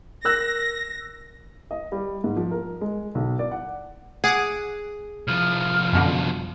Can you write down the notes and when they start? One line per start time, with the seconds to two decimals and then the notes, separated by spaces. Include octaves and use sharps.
0.25 A#4 E6 F#6 A#6
1.71 D#5
1.92 G3
2.24 G#2
2.37 F3
2.51 A#4
2.81 G#3
3.15 B1
3.39 D5
3.52 F#5
4.24 G#4 F#5 D6 D#6
5.27 C2 F3 F6
5.93 F#2 B2 D3